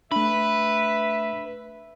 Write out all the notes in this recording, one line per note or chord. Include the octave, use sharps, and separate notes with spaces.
A3 D4 B4 E5